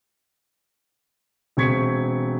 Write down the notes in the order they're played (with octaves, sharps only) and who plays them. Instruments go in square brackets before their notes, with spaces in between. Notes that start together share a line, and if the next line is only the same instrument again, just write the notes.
[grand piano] E1 C4 C#6 G#6 B6 C#7